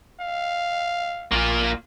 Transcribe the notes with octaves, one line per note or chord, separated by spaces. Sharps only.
F5
A#1 A#3 F4